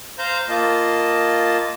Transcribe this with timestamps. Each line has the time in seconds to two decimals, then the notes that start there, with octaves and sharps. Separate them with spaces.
0.19 C5 F5 A#5 G6
0.49 A#3 F4 D#5 A5